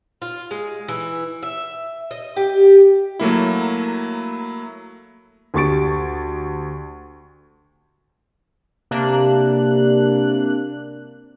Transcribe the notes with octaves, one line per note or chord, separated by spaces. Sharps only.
F4
G#3
E3
E5
D#5
G4
F#3 A3 A#3 E4
D2 G4 C#6 A6 D7
C3 A#3 D4 F#6